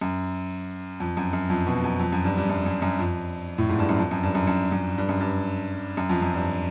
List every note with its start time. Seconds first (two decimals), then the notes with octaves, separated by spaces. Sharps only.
0.01 F#2
1.00 F2
1.17 F#2
1.33 F#2
1.50 F2
1.67 B2
1.84 F#2
1.99 F2
2.12 F#2
2.24 G2
2.37 G2
2.50 F#2
2.66 F#2
2.82 F#2
2.99 F2
3.58 A2
3.69 G#2
3.79 G2
3.89 F#2
3.99 F2
4.11 F#2
4.23 G2
4.35 F#2
4.47 F#2
4.72 F#2
4.98 G2
5.09 F#2
5.21 G2
5.97 F#2
6.10 F2
6.22 F#2
6.34 G2